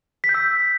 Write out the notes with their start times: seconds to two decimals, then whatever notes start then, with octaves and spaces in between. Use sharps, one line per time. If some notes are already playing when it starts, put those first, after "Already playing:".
0.24 B6
0.29 G6
0.34 E6